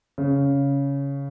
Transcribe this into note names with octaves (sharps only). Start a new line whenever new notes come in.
C#3